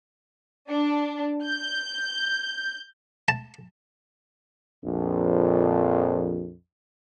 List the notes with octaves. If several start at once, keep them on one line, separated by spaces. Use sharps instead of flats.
D4
G6
A5
A#1 F2